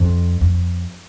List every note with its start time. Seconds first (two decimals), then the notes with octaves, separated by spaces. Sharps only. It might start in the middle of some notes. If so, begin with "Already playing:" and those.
Already playing: F2
0.41 F2